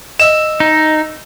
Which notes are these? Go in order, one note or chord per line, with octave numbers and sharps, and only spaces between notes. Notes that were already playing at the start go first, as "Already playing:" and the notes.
D#5 E5 E7
D#4